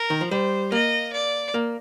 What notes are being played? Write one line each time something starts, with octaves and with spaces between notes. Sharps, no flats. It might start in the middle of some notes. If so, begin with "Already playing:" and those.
Already playing: A#4
D#3
F3
G3 C5
A#3 D#5
D5
A#3